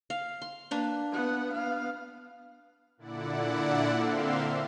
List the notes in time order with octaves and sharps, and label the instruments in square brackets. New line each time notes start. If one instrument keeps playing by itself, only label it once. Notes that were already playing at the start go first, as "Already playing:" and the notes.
[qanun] F5
C6
A#3 D4 B4
[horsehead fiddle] B3 F#5
B3 F5
[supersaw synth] A#2 D3 E4 D5 F#5
D3 A#3 C4 E5 F5 C6